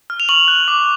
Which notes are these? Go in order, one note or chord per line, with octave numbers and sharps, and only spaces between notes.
F6
F7
C#6 F#7
F#6
D6